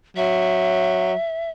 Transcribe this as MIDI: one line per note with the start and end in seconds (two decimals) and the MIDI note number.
0.17 1.14 54
0.17 1.50 76